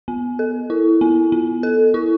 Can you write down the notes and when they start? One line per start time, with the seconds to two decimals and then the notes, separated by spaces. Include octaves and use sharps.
0.08 B3
0.39 A4
0.70 E4
1.01 B3
1.32 B3
1.63 A4
1.94 E4